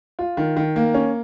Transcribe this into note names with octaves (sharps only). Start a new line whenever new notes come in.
F4
D#3
D#3
A#3
C#4